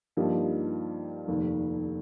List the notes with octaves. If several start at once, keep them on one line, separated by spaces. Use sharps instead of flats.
G2 F3 A#3 D#4 G4
F1 D#2 D#3